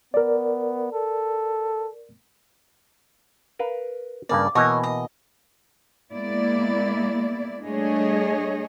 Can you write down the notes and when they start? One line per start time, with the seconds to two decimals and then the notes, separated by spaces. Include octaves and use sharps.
0.14 B3 A#4 D5
0.93 A4
3.59 A#4 B4 F5
4.29 G2 C#3 A#3 D5
4.55 B2 E3 A#3 C#5 D#5 G#5
4.83 D#5
6.13 G#3 A#3 B3 E4 D5
7.66 G3 A3 D4 G#4 C#5 D#5